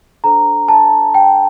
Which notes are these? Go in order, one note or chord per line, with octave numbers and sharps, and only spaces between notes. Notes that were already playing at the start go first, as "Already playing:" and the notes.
D4 A4 C5 A#5
A5
G5